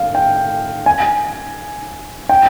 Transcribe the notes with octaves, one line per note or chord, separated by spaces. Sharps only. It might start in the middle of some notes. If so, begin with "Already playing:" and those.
Already playing: F5
G5
G#5
G5